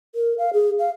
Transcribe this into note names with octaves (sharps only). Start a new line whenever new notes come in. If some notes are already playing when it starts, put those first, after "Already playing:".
A#4
F5
G#4
F5